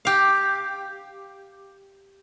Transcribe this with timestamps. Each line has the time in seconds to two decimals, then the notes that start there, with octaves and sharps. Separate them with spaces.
0.05 G4 F5